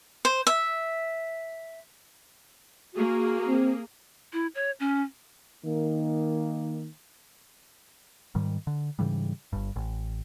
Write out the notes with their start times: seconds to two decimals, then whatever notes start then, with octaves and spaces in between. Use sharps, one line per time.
0.25 C5
0.47 E5
2.94 A#3 F#4 G#4
3.48 C4
4.33 E4
4.55 C#5
4.80 C#4
5.65 D#3 A#3
8.35 G#2 D#3 G3
8.67 D3
8.99 G#2 C#3 E3 G3
9.53 G1 G2
9.76 A1